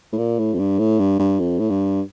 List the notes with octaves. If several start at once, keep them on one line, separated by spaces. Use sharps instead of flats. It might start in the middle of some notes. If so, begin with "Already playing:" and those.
A2
A#2
A2
F2
G2
A2
G2
G2
F2
A2
G2